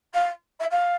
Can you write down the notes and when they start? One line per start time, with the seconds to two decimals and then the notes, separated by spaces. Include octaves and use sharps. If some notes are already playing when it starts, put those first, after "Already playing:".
0.14 F5
0.60 E5
0.71 F5